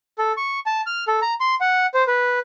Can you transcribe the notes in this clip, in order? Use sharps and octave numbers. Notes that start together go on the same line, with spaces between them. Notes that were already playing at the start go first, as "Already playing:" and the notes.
A4
C#6
A5
F6
A4
A#5
C6
F#5
C5
B4